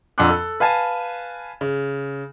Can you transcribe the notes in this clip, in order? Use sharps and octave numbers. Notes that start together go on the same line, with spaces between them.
F2 D4 F#5 C6 D6 F#6
A4
B4 F5 G#5 A5
C#3